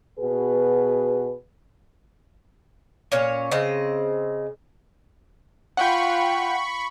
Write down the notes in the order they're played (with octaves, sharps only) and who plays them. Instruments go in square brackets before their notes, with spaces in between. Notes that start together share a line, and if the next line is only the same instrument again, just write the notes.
[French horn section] B2 F#4 G#4 B4
[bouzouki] A#2 C#4 C#5
C#3 C4 D#5
[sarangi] F4 [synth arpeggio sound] F#5 G5 [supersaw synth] B5 C#6